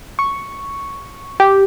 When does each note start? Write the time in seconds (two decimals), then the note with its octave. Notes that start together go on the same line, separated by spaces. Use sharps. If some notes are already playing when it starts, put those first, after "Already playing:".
0.19 C#6
1.40 G4